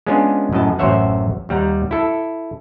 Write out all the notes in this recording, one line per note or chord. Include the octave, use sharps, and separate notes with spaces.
G#3 B3 C#4 D4 F4 G#4
F#2 A2 D#5 A5
A1 F#2 C5 C#5 E5 F#5
D#2 G3 F#5 A#5
E4 A4